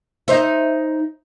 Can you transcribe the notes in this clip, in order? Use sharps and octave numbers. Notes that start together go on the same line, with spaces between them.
D#4 C5 E5